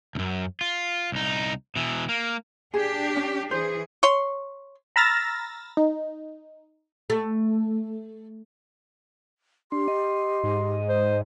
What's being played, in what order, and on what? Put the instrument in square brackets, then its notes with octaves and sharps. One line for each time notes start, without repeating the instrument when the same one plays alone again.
[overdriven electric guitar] C#2 F#2
F4
C2 D#4
B2 E3
A#3
[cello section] D4 G4 [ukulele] G#4
[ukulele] C#4
[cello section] E3 G#4 [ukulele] C5
[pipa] C#5 C6
[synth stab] A#5 B5 E6 F6 A6 A#6
D#4
[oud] A3
[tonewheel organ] D4 [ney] G4 [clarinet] C6
[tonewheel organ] D#5
[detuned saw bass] G#2
[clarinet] C5